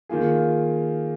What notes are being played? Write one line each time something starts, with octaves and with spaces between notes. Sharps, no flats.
D#3 A#3 F4 G#4